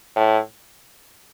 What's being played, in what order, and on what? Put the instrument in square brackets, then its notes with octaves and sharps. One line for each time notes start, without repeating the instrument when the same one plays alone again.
[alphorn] A2